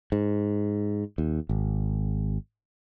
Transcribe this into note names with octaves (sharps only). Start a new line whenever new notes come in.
G#2
D#2
G#1